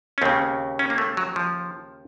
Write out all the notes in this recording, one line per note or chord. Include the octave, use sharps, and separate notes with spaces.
C#4
D#2 C#3 C4
C#4
A#3
A3
F#3
F3